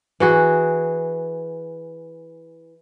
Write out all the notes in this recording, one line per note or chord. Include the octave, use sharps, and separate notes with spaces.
E3 F#4 G#4